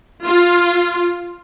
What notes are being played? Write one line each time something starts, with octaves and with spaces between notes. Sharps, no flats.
F4